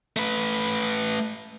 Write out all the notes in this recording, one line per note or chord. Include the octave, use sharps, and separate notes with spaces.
A3 B4